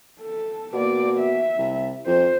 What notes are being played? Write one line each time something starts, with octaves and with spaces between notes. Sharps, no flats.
A4
B2 A#3 D5
E5
C2
F2 C5